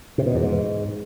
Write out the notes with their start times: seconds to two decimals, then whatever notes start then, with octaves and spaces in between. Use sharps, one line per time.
0.18 C3
0.26 B2
0.34 E2
0.43 G#2